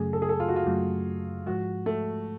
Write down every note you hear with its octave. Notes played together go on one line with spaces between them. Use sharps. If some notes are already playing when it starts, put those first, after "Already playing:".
Already playing: F#2 C#3 F#3 A3 G#4
A4
G#4
A4
F4
F#4
F4
F#2 C#3 F#3 A3
G#2 F3 G#3 F#4
A3